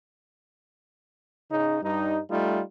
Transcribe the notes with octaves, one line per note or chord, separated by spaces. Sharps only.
C#3 D#4
G2 G3 D#4
G3 A3 D#4 F4